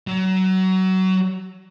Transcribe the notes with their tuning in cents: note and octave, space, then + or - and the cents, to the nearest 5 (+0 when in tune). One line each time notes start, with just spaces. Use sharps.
F#3 +25